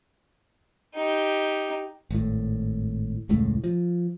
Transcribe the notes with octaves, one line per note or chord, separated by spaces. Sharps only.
D#4 G4
G#1 A2
E1 C#2 A2 A3
F3